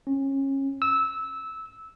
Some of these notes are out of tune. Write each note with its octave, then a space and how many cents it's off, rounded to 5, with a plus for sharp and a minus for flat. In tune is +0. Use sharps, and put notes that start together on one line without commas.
C#4 -25
E6 -15